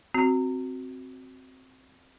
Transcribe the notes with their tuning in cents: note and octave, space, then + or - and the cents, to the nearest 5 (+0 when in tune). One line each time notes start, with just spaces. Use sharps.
C4 +0 F#4 +0